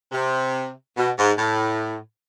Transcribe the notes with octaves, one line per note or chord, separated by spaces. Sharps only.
C3
B2
G#2
A2